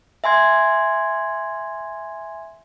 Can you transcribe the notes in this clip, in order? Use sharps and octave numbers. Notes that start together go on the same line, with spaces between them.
E5 G#5 C6 G#6